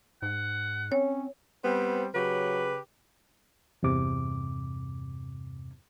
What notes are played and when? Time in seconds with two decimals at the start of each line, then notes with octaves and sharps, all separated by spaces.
0.22 G#2 F#5
0.92 C4 C#4 C#5
1.64 G3 B3 C4 C5
2.15 C#3 F#3 G4 B4
3.83 E2 G2 C3 D6